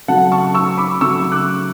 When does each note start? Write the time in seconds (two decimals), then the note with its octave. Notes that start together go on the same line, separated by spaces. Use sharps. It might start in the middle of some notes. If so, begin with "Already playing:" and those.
0.08 C#3 F#3 A3 F#5 A5
0.32 A5 C#6
0.54 C#6 E6
0.78 B5 D6
1.01 C#3 F#3 A3 C#6 E6
1.32 D6 F#6